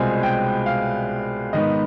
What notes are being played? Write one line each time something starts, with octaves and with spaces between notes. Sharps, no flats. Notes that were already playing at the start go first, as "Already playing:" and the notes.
Already playing: C2 B2 G#3 C4 F4 G#5
G5
F5
G#2 D#3 B3 D#5